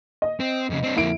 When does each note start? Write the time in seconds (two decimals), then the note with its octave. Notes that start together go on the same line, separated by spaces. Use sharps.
0.22 D#5
0.40 C4
0.70 F2 C#3
0.83 C4 D4
0.97 F2 A#3 E4 D7